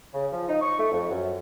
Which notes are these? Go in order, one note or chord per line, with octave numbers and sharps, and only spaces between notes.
C#3
F3
D#4
C#6
A3
F2
F#2